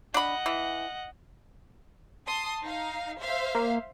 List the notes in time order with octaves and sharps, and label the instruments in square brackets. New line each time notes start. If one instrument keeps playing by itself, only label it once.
[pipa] D4 B5 [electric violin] D#5 F#5
[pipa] E3
[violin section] A5 C6 D#6
D#4 F5
C5 E5 F5
[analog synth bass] A#3